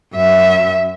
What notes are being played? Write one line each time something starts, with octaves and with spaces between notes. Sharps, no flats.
F#2 E5